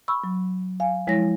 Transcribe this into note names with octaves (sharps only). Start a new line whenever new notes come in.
B5 C#6 E6
F#3
F5 G#5
F3 G#3 E4 C#5 A#6